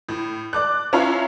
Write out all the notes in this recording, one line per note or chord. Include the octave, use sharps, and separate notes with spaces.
A2
D5 D6 F#6
C#4 E4 F4 F5 A#5